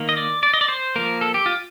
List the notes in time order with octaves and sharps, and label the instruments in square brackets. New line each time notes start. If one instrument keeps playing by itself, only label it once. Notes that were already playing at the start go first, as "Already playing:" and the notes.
Already playing: [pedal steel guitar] D#3 A#3
D#5
D5
D5
D#5
D5
C5
F3 A#3 A#4
A4
G4
F4